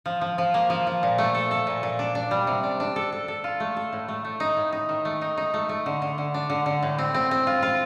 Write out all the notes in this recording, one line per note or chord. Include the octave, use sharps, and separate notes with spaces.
F3
F3
F3
A#3
F3
F3
A#2
A3
A4
A4
A#2
A#2
D4
D4
G3
C3
D4
D4
A4
A4
A4
F4
A3
A4
A2
A3
A3
D#4
A2
D#4
D#3
A3
D#4
D#4
A3
A3
D3
D3
D3
D4
D3
D3
A2
C4
C4
C4
F4
F4